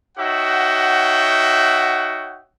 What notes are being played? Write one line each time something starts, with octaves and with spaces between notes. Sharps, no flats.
D#4 F#4 C#5 E5 F#5 G5